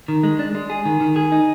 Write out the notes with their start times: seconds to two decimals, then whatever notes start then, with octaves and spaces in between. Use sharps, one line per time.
0.08 D#3
0.23 G#3
0.39 D4
0.55 G#3
0.70 G#4
0.85 D#3
1.01 D#3
1.16 G#4
1.32 D#4